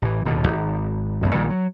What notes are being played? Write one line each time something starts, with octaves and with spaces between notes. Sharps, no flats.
A1 E3
D1 D#2 B2 D3
G#1
A1 F#2 B3
A#1 A#2 D#3 G3
F#3